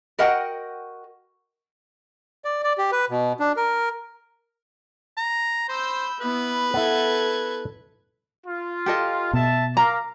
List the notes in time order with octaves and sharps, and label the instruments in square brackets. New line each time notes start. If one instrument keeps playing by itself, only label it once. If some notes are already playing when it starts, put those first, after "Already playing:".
[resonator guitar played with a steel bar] F#4 A#4 D#5 F#5 G5
[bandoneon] D5
D5
G4
B4
B2
D4
A#4
[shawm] A#5
[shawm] C5 [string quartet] B5 E6 G6
[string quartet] B3 E4 [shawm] B4
[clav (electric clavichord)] B3 E4 [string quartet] A4 G#6
[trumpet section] F4
[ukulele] G4 A4 D#5
[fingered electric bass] B2 [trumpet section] E5 A5
[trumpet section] A#4 F5 D6 [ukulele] A#5